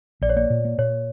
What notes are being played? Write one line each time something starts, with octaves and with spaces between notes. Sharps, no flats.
A#1 D5
C#5
A#3 D5
A#2
A#3
A#2 C#5